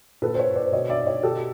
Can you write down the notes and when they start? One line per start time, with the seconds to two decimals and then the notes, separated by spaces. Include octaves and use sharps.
0.22 A#2 A4 B4
0.35 C5
0.39 B4 C#5
0.56 C5 D5
0.73 B2 C#5 D#5
0.90 D5 E5
1.06 C#5 D#5
1.23 B2 G4 A4